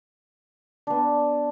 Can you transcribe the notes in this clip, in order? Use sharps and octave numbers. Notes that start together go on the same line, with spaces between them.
B3 D4